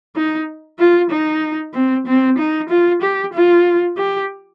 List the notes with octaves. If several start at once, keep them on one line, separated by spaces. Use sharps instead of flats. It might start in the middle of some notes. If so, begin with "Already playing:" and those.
D#4
F4
D#4
C4
C4
D#4
F4
G4
F4
G4